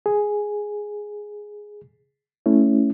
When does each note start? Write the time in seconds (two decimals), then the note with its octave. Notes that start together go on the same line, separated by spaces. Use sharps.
0.06 G#4
2.46 A3 C#4 E4